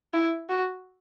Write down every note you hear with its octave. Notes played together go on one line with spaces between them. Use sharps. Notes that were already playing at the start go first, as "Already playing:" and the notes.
E4
F#4